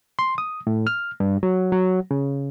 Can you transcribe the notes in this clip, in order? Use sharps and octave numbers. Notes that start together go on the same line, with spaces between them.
C6
D#6
A2
F6
G2
F#3
F#3
C#3